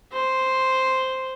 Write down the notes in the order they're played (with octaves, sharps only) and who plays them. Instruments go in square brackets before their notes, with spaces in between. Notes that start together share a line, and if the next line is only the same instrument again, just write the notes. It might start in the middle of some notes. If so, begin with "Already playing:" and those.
[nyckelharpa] C5